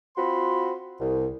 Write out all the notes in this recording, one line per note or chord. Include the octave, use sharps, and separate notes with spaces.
C4 F4 F#4 B5 C6
C2